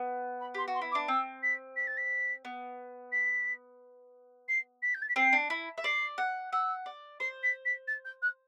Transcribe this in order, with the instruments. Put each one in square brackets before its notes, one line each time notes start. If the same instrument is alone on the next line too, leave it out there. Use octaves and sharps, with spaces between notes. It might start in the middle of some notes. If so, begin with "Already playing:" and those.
Already playing: [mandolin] B3
[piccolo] B5
[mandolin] G4 [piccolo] C6
[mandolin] F#4
[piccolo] C6
[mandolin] E4
[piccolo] D6
[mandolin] D4
[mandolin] C4 [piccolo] E6
[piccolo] B6
B6
A6
B6
[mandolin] B3
[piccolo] B6
C7
B6
G6
A6
B6
[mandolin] C4 [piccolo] C7
[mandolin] D4
E4
E5
[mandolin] D5 [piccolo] C7
[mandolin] F#5
[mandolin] F#5 [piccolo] E6
[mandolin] D5
[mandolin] C5 [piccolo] C7
[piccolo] B6
B6
A6
G6
F#6